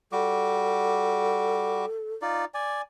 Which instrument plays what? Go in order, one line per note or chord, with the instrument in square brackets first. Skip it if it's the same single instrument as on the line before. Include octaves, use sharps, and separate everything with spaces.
[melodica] G3 F#4 D6 [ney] A4
[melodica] D#4 F4 D5
D5 G#5